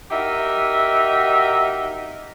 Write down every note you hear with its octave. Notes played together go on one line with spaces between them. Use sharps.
D#4 F#4 G4 A#4 D#5 E5